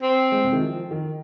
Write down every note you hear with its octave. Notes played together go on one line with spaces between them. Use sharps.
C4
G#3
C3
D#3
F3
D#3